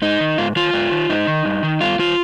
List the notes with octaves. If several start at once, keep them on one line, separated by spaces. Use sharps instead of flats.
G#2 D#4
D#3
G#2 F4
D#3 F4
G#2
D#3
G#2 D#4
D#3
G2
D#3
G2 F4
D#3 F4